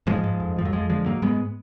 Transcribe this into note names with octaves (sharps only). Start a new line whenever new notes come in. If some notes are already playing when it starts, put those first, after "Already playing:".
G#2 F3 G#3
G#2
F2
F2 F3
F#3
F2 F3 G#3
D3 F3 G#3
G#2 F#3 A#3
G#2 G#3 B3